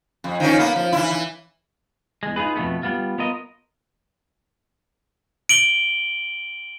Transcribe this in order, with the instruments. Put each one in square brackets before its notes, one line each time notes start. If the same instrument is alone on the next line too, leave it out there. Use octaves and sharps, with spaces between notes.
[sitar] F2
D#3 F3 C#4
A#3 B3
F3
E3 E4
E3
[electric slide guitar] E2 G#3
D#4 F4 G#4 B4
F2 B2 A3 B3
G3 B3 F4
B3 F4 A#4 D#5
[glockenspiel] D7 F#7 G7